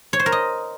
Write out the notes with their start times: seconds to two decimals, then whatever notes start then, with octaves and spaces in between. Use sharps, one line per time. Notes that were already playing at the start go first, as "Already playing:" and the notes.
0.13 C#5
0.19 C5
0.26 A#4
0.32 D#5